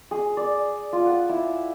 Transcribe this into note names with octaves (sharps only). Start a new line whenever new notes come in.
G#4
D5
F4
F#5
E4